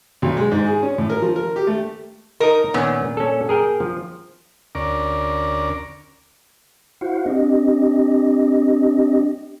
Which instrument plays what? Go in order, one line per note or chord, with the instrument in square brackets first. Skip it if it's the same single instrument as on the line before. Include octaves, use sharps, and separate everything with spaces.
[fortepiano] B1
G#3
G#2
G#4
C#4
A2
A#4
F3
A#4
G4
A3
[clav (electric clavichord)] D#4 D#5 [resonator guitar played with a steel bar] A#4
[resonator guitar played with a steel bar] A#2 [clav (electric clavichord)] D#3 B3 C#4
[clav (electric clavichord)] C#4 A4
G#4 A#4 G5
F3
[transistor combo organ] D2 C#4 A#4 D5
[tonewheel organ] E4 F#4 C5 F5 F#5
C4 D4 G4 D#5